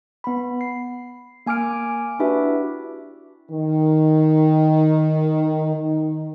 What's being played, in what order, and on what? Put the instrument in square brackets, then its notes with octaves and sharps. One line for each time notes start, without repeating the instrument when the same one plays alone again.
[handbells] B3 B5
C7
A#3 G#5 D6 F6 D7
D4 E4 F#4 G4 B4 E5
[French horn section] D#3
D#3